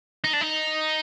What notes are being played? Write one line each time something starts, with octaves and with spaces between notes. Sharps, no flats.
D#4
D4
D#4